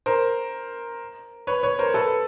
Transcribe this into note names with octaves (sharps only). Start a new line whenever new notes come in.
A#4 C5
B4 C#5
B4 C#5
A#4 C5
A4 B4